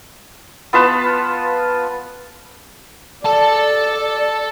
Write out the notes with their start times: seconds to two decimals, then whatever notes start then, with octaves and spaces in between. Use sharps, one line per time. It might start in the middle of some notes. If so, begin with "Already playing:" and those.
0.73 B3 F4 B4 A5
3.25 A4 D5 A5